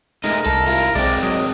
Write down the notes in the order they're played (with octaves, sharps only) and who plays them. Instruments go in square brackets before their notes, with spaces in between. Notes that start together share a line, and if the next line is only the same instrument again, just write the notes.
[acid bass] G#3 [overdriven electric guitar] A3 D#4 [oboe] A#4
[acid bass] C2 [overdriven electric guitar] A4
[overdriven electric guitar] E4 F4
[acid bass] B1 [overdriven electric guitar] G#3 C4 [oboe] D5
[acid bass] F#3 [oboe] D#5